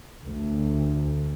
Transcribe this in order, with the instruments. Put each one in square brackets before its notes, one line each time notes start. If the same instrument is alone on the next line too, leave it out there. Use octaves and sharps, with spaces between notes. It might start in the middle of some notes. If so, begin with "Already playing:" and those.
[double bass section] D2